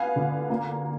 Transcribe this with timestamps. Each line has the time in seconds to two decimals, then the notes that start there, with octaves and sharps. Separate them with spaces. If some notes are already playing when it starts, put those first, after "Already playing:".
Already playing: B3 F5 G#5
0.16 D3
0.50 A#3